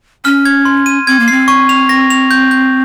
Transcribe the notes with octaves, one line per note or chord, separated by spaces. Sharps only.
C#4 F6
G#6
C6
D#7
C4 G#6
A#3
C4 C7
C#6
F7
A#6
F7
G6
G6